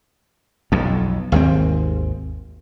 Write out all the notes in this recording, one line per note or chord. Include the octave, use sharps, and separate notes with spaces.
B1 F2
G#1 D#2 G#3 C4